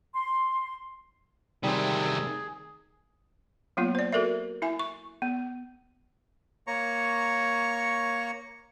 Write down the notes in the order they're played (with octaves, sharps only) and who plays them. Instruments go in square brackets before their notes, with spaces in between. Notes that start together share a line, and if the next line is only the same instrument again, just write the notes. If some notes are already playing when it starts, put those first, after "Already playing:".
[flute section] C6
[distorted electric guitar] C3 A3 [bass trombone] D#3 [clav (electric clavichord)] G3 C4 [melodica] G#4
[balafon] F#3 A#3 B3 F4
C5 D5
F#4 A4 A#4 D5 E5
E4 E5 G#5
C#6
B3
[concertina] A#3 C#5 A#5 C#6